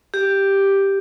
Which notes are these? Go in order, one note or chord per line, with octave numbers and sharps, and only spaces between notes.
G4